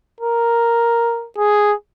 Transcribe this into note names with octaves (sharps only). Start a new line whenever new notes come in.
A#4
G#4